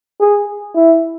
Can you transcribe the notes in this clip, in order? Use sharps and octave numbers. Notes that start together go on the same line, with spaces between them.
G#4
E4